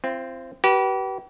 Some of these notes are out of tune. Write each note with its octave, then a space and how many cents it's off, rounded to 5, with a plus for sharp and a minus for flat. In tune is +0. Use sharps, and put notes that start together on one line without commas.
C4 +0 F4 -40
G4 -40 B4 -25